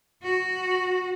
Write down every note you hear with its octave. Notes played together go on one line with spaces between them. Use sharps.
F#4